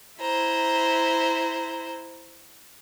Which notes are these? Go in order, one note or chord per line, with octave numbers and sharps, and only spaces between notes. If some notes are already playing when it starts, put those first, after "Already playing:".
E4 C5 A#5